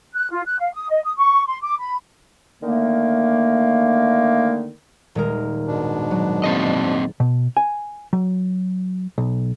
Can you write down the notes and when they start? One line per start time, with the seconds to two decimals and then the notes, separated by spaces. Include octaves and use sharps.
0.15 F#6
0.31 F4
0.46 F#6
0.60 F5
0.73 D#6
0.90 D#5
1.04 D#6
1.17 C#6
1.46 C6
1.62 D6
1.79 B5
2.62 D3 D#3 A3 A#3
5.15 D#1 G#3 A#4
5.67 G#2 B2 D4
6.11 F#3
6.44 A#3 C4 G#4 D#5 A6
7.20 B2
7.57 G#5
8.13 F#3
9.18 B1